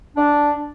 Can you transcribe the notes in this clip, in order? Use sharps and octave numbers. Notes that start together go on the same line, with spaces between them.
D4